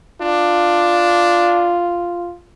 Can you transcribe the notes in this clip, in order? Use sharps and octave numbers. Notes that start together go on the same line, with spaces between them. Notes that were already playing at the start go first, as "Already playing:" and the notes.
D4 F4